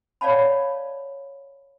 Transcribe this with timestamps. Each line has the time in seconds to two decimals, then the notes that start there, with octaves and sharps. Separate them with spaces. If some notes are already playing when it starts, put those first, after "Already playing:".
0.21 C#5 D5 F5 F#5 A5 B5